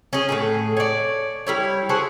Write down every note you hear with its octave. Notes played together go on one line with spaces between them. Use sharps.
C#4 G#4
A2 C#3 G#4
C#5 D5
G3 E4 C#5
F#4 G#4 A4 C5